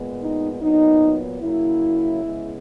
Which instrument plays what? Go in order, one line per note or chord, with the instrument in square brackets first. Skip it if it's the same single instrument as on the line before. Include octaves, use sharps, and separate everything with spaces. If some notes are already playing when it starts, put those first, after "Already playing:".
Already playing: [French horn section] A#2 G#3 B3
D#4
A#2 F#3 B3 D#4
C#3 F#3 A#3 E4
C#3 G#3 B3